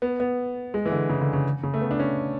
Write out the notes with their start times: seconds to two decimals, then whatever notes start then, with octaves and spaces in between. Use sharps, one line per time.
0.02 B3
0.20 B3
0.74 G#3
0.86 E3
0.92 D3
1.09 C#3
1.21 D3
1.33 C#3
1.63 C#3
1.74 A3
1.81 B3
1.91 D4
2.00 C#4